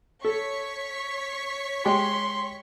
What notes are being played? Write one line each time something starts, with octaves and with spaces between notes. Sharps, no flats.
A4 C#5 C#6 B6
G#3 G4 G5 C6